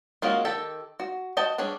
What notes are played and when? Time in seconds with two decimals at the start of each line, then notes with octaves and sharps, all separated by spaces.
0.22 G#3 A#3 C#4 F4 F#4
0.45 D#3 G4 A4
1.00 F#4
1.37 F#4 D#5 G5 A5
1.58 G3 D4 G#4 C#5